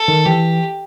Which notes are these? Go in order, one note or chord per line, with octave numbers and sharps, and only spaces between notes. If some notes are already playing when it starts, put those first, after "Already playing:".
Already playing: A4
D#3
E3 G4